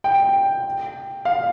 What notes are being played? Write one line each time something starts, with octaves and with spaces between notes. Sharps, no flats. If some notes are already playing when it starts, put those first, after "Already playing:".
G5
F5